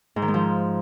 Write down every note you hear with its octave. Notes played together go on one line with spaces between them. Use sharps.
G#2
D#3
G#3
F3